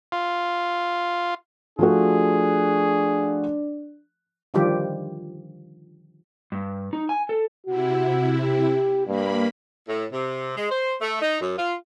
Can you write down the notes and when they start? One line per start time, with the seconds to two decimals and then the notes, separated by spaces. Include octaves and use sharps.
0.12 F4
1.79 F3 A3 D4 F#4 G#4
4.54 D3 D#3 F3 G3 F4 G4
6.52 G2
6.93 D#4
7.09 G#5
7.29 A4
7.66 C3 E4 F#4
8.42 G4
9.07 G2 A#3 B5
9.88 A2
10.13 C3
10.57 G#3
10.70 C5
11.01 A3
11.22 D#4
11.41 F#2
11.58 F4